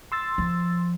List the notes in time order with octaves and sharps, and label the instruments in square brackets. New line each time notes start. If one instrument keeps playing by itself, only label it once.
[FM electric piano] C6 E6 A6
[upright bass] F3